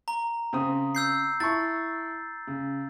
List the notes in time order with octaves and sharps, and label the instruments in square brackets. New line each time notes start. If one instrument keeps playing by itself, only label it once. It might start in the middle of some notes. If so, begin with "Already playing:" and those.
[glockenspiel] A#5
[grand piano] C#3 C4 D#6
[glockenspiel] E6 G6 C7
[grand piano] E4 A5 C#6 [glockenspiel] A6
[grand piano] C#3